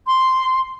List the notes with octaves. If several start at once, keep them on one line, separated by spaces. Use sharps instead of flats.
C6